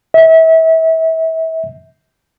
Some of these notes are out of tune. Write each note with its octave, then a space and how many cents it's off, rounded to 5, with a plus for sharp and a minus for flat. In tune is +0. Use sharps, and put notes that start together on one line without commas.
E5 -30